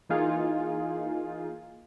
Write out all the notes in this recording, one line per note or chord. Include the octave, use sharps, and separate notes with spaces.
E3 A#3 D#4 F4 G#4